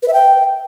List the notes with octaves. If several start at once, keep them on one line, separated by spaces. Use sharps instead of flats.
B4
E5
G5